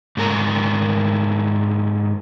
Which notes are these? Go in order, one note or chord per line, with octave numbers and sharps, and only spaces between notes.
G#2 A3 A#4 A5 A#5